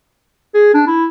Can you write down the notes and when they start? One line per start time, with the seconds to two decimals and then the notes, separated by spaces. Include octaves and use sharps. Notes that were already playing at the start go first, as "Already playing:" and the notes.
0.54 G#4
0.74 D4
0.87 E4